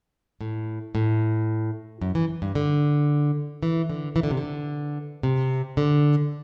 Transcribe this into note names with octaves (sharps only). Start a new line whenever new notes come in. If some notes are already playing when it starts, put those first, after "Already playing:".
A2
A2
F#2
E3
G2
D3
E3
D3
E3
D3
C3
D3
C3
D3